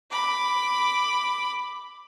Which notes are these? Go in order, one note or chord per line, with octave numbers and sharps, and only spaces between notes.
B5 D6